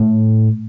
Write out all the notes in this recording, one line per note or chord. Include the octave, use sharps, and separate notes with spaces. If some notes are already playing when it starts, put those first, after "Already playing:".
Already playing: A2